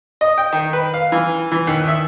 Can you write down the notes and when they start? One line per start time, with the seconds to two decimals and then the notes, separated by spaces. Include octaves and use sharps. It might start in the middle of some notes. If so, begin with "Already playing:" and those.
0.21 D#5
0.38 G5
0.52 D#3
0.73 B4
0.94 F5
1.12 E3
1.52 E3
1.67 D#2
1.88 E5